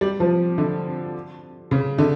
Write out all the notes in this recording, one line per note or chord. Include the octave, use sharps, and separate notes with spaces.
G3
F3
D3
C#3
D3